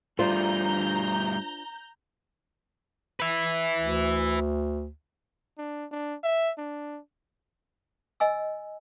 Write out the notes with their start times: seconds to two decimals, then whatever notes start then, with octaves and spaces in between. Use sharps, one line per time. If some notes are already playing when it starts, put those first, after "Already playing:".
0.19 G2 G3 A3 D4 F4 C5 A#5 G6
3.20 B4 E5
3.80 D2
5.58 D4
5.92 D4
6.24 E5
6.58 D4
8.20 D#5 G#5 E6